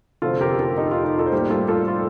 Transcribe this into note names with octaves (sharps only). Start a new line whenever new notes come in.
F1 F2 D3 F3 C4 F4 A4
G4 A#4
F4 A4
D#4 G4
F4
D#4
F4 A4
C5
A2 G3 A#3 G4 A#4
F4 A4
F4 A4
F4